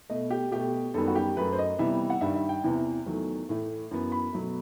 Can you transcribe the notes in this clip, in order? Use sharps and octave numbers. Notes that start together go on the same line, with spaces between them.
B2 A3 D#5
G4
B2 A3 G4
F#2 D#3 G3 B3 A4
F#4
G4
F#2 F#3 A3 B4
C5
D#5
C3 E3 G3 B3 E5
F#5
G2 D#3 G3 E5
E5
G5
E2 C3 E3 B3
E2 D#3 F#3 A3
A2 E3 A3
F#2 E3 B3
B5
B2 F#3 A3